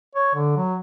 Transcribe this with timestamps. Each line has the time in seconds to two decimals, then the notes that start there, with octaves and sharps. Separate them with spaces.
0.16 C#5
0.35 D3
0.57 F#3